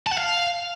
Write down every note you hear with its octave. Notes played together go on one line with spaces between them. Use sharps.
A5
F#5
F5